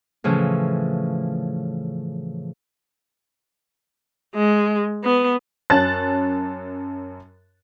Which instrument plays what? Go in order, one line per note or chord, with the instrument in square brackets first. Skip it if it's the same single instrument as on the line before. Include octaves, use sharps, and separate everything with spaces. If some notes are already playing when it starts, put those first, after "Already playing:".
[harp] A2 C#3 E3 F3 C#4
[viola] G#3
B3
[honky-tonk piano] F#2 C#4 A5 F#6 A6